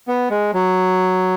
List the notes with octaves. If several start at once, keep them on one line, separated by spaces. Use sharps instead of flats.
B3
G#3
F#3